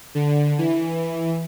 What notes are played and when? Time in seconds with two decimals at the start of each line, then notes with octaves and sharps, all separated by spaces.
0.15 D3
0.58 E3